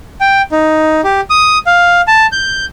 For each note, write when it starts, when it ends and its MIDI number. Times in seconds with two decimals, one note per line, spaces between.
0.21 0.42 79
0.52 1.01 63
1.04 1.21 67
1.30 1.58 87
1.67 2.01 77
2.08 2.27 81
2.32 2.65 91